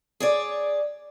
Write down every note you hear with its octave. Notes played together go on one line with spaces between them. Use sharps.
G#4 C#5 D5